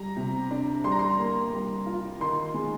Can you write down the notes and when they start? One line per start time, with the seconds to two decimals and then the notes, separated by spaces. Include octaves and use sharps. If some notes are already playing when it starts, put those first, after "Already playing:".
Already playing: G3 A#5
0.17 C3
0.51 D4
0.84 G3 C6
0.92 A#5
0.99 C6
1.19 A#3
1.53 G3
1.86 F4
2.20 D#3 C6
2.54 G#3